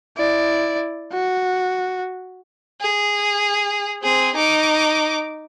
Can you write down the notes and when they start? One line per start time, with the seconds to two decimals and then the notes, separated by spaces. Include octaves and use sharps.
0.18 E4 D5
1.12 F#4
2.82 G#4
4.03 C4 G#4
4.35 D#4 D6